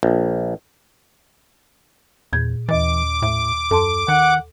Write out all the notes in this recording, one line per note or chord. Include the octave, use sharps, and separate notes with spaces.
A#1
E2 A#2 G6 G#6
D#2 E3 D#5 D6 A6
A2 E5
F#2 A4 A5 C6
D#3 F#5